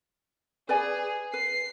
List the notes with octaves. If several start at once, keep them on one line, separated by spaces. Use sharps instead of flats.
G#4 B4 D5 G#5
B4 C7